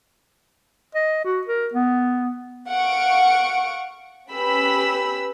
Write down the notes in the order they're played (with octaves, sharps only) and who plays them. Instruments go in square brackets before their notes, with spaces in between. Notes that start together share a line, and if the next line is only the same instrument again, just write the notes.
[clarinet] D#5
F#4
A#4
B3
[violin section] F5 F#5 C#6 C#7 D7
C#4 G4 B4 B5 E6 B6